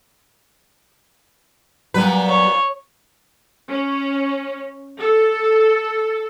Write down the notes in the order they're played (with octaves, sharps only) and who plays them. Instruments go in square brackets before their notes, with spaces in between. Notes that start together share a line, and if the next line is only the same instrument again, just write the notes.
[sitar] A#2 B3 B4 [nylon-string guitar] F#3 G3
[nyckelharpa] C#5
[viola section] C#4
A4